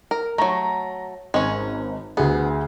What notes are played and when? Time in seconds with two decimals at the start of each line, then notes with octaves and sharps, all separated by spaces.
0.11 A#4
0.38 F#3 A3 A#5
1.34 G#1 G#3 C#4
2.17 D2 B3 G#4